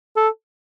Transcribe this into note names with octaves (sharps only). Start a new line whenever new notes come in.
A4